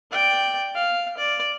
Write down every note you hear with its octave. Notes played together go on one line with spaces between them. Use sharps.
D5 G5
F5
D5